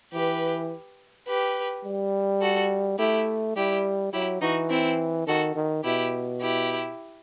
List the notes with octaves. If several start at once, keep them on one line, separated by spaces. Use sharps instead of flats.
E3 G4 B4
G4 B4
G3
F#4 A4
A3 E4 G4
G3 E4 G4
F#3 E4 G4
E3 D#4 F#4
C4 E4
D#3 F#4 A4
D#3
B2 E4 G4
E4 G4